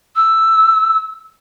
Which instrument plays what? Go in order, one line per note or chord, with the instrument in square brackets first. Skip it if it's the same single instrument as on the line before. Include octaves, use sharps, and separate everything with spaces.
[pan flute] E6